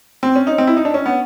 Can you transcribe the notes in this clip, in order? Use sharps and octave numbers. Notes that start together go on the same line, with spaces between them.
C4
C#4
D#4
C4
E4
D#4
D4
C#4
B3